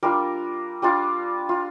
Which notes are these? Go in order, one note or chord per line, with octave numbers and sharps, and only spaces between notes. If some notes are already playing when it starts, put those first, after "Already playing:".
G3 D4 F4 A#4
G3 D4 F4
F4